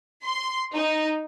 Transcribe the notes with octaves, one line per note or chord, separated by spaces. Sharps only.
C6
D#4